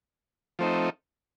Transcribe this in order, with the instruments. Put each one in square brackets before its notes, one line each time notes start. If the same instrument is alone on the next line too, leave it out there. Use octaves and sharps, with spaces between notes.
[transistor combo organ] F3 A3 C4 D#4